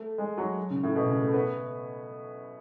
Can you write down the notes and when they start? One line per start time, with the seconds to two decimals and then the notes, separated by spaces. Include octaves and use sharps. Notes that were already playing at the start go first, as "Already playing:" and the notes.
Already playing: A3
0.18 G#3
0.38 F#3
0.70 C#3
0.83 A2
0.95 B2
1.08 C#3
1.21 A3
1.34 B3